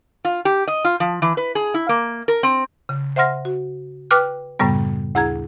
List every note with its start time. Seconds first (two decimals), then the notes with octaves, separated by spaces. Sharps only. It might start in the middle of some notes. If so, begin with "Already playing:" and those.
0.25 F4
0.45 G4
0.68 D#5
0.84 F4
1.00 F3
1.22 E3
1.37 B4
1.55 G#4
1.74 E4
1.89 A#3
2.28 A#4
2.43 C4
2.89 C#3
3.16 C5 E5 F#5 C6 F6 A#6
3.45 F#4
4.11 B4 G5 D6 F6 F#6
4.59 F#2 A2 C#3 G3 B3
5.15 D2 E4 G#4 A#5 G#6